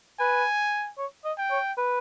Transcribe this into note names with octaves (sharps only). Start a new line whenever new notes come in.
B4 G#5
C#5
D#5
G5
C#5
B4